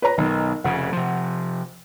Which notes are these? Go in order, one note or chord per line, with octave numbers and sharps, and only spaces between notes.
B4 C#5 A#5
B1 D#3
F1 C#3 F#5
C3 F3